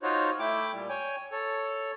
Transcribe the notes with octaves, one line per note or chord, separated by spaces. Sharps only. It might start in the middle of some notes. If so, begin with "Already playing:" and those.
D#4 F4 F#4 C5 C#5
A3 E4 G5 D6
A#2 G3
C#5 G5 G#5
A4 C#5